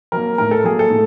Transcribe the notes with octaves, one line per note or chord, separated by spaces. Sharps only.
F#3 A#3 A#4
A2 A#4
A4
F#3 A#3 G#4
A4
A2